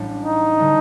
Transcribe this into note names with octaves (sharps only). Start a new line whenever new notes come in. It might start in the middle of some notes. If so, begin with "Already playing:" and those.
Already playing: A1 A2 G3 D4
D#4
D3 G3 D4